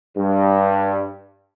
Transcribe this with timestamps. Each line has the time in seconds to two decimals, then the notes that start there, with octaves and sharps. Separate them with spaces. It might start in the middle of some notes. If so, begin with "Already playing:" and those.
0.17 G2